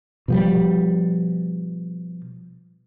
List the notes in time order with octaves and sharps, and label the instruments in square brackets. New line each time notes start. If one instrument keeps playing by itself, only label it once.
[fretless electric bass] B2 F3 G3